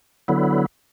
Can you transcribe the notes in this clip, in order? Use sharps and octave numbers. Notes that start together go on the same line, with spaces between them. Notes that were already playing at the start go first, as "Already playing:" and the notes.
D3 F#3 B3 E4